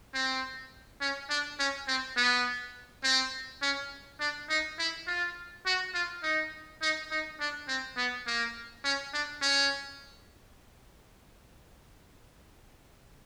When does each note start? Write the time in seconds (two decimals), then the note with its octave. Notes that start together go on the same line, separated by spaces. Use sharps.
0.14 C4
1.01 C#4
1.30 D4
1.59 C#4
1.88 C4
2.17 B3
3.04 C4
3.62 C#4
4.20 D4
4.49 D#4
4.79 E4
5.07 F4
5.66 F#4
5.94 F4
6.23 D#4
6.82 D#4
7.11 D#4
7.40 D4
7.68 C4
7.97 B3
8.26 A#3
8.84 C#4
9.14 D4
9.42 C#4